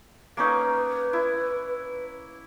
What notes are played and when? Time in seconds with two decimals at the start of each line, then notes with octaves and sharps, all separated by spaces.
0.37 A#3 C#4 D#4 B4
1.13 E4